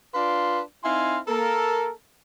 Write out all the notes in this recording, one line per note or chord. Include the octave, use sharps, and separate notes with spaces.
D4 F4 B4 D5 F5 C6
C4 D#4 E4 F5 G#5 C6
A#3 A4 A#4